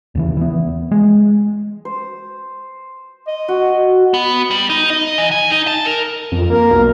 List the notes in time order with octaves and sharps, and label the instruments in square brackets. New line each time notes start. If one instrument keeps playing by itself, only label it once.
[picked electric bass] D#2 C#3 E3
E3 B3
G#3
[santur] C5
[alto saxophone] D#5
[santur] F#4
[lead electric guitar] B3
G3
D#4
D#5
E3
G#5
D#4
A5
A#4
[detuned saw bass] F2
[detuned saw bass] A#3 [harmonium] A#4
[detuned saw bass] B1